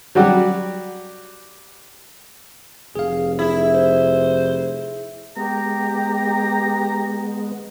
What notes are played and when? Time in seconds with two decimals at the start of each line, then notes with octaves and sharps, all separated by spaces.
0.15 F#3 G3 F#4 G4
2.95 F1 G#4 F5
3.39 E4 G#4
3.74 C5
5.37 G#3 B3 G4 A#5